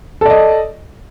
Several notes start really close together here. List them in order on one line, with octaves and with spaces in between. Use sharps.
A4 D5 D#5